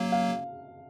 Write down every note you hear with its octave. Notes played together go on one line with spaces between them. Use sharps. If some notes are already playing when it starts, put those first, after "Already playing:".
Already playing: F#3 A#3 F5
F5